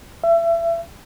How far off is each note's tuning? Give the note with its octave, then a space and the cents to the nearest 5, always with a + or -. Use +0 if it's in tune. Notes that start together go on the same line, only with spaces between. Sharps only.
E5 +30